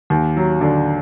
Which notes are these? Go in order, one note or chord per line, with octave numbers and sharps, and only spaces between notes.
D#2
F#3
D3